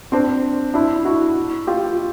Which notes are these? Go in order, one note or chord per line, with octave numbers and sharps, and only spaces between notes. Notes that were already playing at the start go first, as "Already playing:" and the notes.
C4 D4
D4 E4
E4 F#4
F4 G4